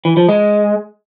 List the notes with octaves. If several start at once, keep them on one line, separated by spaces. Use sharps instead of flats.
E3
F3
G#3